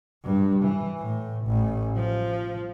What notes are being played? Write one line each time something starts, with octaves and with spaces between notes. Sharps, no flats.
G2
E3
A2
A1
F3